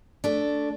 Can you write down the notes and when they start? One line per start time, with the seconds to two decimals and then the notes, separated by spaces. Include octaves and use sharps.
0.24 A3 D4